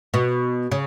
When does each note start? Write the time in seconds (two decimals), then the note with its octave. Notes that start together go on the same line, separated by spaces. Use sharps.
0.14 B2
0.72 C#3